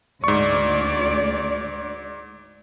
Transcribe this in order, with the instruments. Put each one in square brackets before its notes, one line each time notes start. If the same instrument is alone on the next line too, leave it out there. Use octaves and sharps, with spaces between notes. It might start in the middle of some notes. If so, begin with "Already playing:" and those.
[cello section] D2 D5 [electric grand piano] G#2 C#6